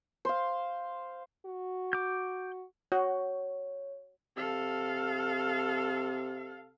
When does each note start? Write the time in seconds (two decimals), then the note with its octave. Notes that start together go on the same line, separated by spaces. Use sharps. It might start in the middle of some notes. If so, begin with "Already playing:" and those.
0.25 C5 F5
1.46 F#4
1.93 D6 G6
2.92 F#4 C#5
4.36 C3 A4 F5